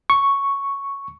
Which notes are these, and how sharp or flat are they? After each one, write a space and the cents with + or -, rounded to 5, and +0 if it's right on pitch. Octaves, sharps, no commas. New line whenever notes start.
C#6 +0